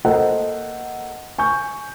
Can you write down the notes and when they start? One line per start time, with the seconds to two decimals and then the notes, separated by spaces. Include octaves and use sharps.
0.05 A#3 A4 C5 D#5 F#5
1.38 G#5 C#6 G6